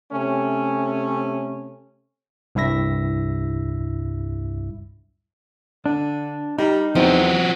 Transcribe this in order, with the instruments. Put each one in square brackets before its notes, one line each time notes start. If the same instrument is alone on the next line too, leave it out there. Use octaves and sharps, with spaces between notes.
[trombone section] C3 A3 C#4
[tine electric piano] C2 G2 E4 E5 A#6
[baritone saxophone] D3 [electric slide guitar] D4
[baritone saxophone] G3 [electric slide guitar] D#4 [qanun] A#4
[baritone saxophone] E2 [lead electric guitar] F3 F#4 [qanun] C4